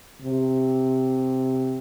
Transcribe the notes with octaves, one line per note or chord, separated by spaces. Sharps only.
C3